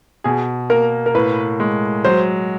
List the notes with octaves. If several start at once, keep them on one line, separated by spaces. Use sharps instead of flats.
B2 G#4
A#3 A#4
A#4
A2 B4
G#3
F#3 C5